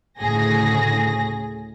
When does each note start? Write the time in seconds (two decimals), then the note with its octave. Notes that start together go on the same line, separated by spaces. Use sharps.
0.20 D2 A2 C#3 G#4 A#6